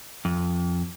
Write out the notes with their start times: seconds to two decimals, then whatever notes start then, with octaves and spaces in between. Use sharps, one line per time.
0.25 F2